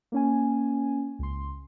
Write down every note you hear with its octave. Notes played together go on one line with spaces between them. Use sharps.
A#3 C#4 G#5
C#2 C6